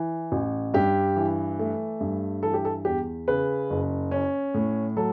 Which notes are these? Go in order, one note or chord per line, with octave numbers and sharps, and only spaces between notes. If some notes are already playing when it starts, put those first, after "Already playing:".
Already playing: E3
A1
G2 G4
E3
A3
G2
E3 A4
G4
A4
E2 G4
C#3 B4
F#1
C#4
A2
F#3 A4